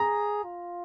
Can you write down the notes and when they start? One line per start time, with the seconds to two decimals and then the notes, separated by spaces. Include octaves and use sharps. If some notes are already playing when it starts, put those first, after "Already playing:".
Already playing: G#4 A#5
0.45 F4